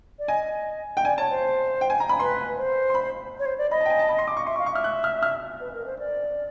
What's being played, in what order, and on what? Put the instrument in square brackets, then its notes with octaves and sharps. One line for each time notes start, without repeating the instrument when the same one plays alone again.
[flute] D5
[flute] D#5 [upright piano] G#5
[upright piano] G5
[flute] D5 [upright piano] G#5
[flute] C#5 [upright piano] A5
[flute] C5
[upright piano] G5
G#5
A#5
B5
[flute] B4 [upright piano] C6
[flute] C5
[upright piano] C6
B5
[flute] C#5
C5
D5
[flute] D#5 [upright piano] B5
[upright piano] A5
G5
G#5
A5
B5
C6
D6
C#6
[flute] E5 [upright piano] C6
[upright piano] C#6
[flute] F5
[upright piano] C#6
[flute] E5 [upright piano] F6
[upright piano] F#6
F6
F6
[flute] B4
A#4
C5
D5